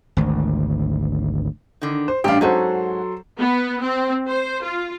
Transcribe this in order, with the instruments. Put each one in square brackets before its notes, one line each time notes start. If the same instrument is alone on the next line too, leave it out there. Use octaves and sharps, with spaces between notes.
[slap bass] G#1 D2
[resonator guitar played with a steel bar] D3 D#3
[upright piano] C5
[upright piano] A1 G2 F5 [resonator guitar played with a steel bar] D4 G4
[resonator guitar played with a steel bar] G#2 C#4 F#5 [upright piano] F#3 A4 C5
[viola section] B3
C4
C5
F4